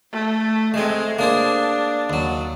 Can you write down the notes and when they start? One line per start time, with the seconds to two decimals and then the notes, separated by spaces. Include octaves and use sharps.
0.11 A3
0.74 G#3 A3 C4
1.19 A#3 D4 G#4 C5
2.10 D#2 F#3